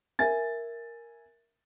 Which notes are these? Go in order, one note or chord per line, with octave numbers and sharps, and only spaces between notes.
A#4 E5 G#5 A6